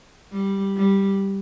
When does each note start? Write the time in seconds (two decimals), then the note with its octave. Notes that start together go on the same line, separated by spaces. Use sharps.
0.32 G3
0.76 G3